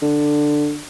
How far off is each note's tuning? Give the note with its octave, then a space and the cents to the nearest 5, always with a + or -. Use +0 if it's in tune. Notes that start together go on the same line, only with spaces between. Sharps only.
D3 +10